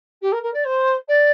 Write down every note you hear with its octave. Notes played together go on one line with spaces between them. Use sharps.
G4
A#4
A#4
D5
C5
D5